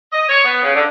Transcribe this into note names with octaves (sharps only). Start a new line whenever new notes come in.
D#5
C#5
B3
C#3
D3